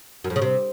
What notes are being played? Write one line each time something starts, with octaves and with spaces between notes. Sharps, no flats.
F#2
F2
C#3
C3